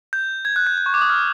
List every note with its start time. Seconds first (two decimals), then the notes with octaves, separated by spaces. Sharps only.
0.13 G6
0.45 G#6
0.56 F#6
0.67 G6
0.78 G6
0.86 C#6
0.94 D6
1.02 D#6
1.10 F6